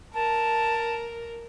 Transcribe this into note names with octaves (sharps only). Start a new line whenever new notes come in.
A#4 A5